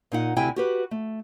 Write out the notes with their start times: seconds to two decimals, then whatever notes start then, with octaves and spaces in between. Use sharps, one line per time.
0.12 A#2 D#4 F#5
0.36 D2 C3 E4 G5 G#5
0.56 F#4 G4 B4
0.91 A3